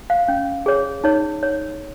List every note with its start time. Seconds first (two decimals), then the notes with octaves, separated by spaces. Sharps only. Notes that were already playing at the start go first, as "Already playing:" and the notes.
0.10 F5
0.28 C#4
0.66 G#4 C#5
1.04 D#4 C#5
1.43 C#5